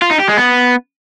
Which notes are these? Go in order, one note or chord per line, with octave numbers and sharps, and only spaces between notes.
F4
D#4
G4
G#3
B3